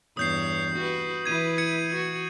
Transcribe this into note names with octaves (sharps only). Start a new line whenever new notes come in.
E2 G2 C#5 D#6 G6 C7
F#4 B4
E3 E4 B4 G#6 D#7
G#6 C#7
F#4